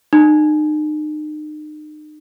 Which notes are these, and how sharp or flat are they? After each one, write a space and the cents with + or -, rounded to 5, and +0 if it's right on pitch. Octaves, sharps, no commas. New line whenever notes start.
D#4 -40